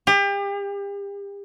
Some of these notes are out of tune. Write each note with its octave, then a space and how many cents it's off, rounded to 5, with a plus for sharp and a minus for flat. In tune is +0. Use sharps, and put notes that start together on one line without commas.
G4 +35